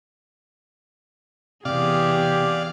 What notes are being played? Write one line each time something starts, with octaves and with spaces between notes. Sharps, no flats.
E2 C3 E3 G4 G#4 D5 F5